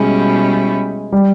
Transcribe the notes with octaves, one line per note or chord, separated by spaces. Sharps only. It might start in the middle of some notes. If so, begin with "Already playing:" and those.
Already playing: B2 G3 G#3 C#4 E4
G3